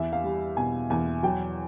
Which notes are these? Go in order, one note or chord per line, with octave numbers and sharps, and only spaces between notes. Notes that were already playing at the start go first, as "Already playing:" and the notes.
Already playing: E2 E5
F5
G3
B2 G#5
E2 G#5
F#3 G5